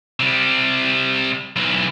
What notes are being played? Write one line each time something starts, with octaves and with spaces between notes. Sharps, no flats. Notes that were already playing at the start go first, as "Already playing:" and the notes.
C3 G3
B1 E3